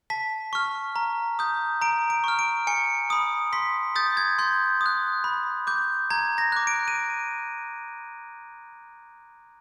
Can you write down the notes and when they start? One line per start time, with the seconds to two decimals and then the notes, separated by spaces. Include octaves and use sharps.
0.10 A5 B6
0.53 C#6 F6
0.96 A#5
1.39 D#6 G6
1.81 A#5 D7
2.10 D7
2.24 C#6 F6
2.39 D7
2.67 G#5 C#7
3.10 B5 D#6
3.53 C6 B6
3.96 D#6 G6 A6
4.17 G#6
4.38 C6 G6
4.81 D#6 F#6
5.24 B5
5.67 D6 G6
6.10 A#5 G#6
6.38 A#6
6.52 D6 F#6
6.67 D7
6.88 D#7